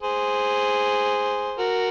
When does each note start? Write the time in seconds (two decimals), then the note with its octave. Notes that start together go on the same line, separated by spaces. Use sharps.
0.02 G#4 C5
1.58 F#4 A#4